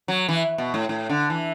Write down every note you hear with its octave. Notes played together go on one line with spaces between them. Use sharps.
F#3
E3
B2
A2
A2
D3
E3